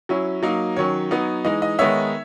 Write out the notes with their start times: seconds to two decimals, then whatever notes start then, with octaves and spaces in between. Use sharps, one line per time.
0.09 F#3 C#4 E4
0.43 F#3 A#3 D#4
0.76 D#3 F#3 C#4 C#5
1.11 F#3 B3 D#4
1.45 E3 G#3 D#4 D#5
1.62 D#5
1.79 D#3 G#3 B3 D#4 C#5 E5